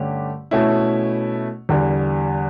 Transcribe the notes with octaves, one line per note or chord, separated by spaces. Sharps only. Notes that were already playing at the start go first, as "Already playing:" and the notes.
Already playing: G2 D3 A3 C#4 G4
B2 A3 C#4 E4
E2 D3 G3